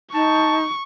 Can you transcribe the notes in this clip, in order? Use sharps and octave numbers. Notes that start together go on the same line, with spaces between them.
D#4 A5 C#6